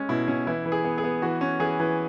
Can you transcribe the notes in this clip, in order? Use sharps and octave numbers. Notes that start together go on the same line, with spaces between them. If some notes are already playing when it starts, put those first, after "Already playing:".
Already playing: G#3 C#4
B2 E4
B2 C#4
E3 E4
E3
G#4
B3
G#4
B3
E3 F#4
C#4
E3 G#4
E3